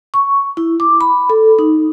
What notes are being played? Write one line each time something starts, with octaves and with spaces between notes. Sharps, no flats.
C#6
E4
D6
B5
A4
D#4